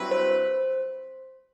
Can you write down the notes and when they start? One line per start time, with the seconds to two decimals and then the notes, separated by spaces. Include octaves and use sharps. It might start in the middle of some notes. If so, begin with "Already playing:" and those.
Already playing: G2 F#3 C4 E4 B4
0.11 C5